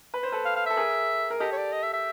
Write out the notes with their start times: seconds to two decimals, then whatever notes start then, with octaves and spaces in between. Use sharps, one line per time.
0.14 B4
0.23 C5
0.32 A4 B4
0.45 F5
0.56 F5
0.66 A4 E5
0.76 G#4 A#4
1.30 A#4
1.40 G4 A4 D#5
1.52 C#5
1.57 D5
1.73 D#5
1.83 E5
1.93 E5